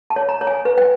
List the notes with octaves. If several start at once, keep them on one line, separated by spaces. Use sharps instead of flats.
A5
C#5
A#5
C#5
G#5
B4
G5